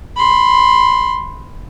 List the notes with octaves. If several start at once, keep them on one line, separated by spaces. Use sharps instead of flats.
B5 C6